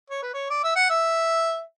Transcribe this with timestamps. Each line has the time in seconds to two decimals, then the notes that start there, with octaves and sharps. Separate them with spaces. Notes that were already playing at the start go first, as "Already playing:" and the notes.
0.10 C#5
0.22 B4
0.34 C#5
0.50 D5
0.64 E5
0.76 F#5
0.90 E5